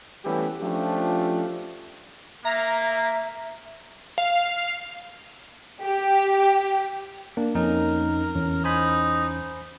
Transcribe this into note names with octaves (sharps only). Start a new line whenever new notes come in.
E3 G3 A3 B3 C#4 G4
F3 A3 C#4 D4 F4 G4
A#3 E5 A#5
F5
G4
A#3 D4
F2 C#4 D#4 A#4
E2 E3 C#4
D#4 C5 G#5 B5